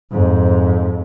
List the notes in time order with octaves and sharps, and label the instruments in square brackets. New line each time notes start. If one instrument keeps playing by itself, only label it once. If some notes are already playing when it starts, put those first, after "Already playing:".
[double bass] F2 G#2